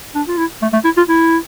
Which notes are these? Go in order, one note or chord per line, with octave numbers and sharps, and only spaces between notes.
D4
F4
E4
A3
A3
E4
F4
E4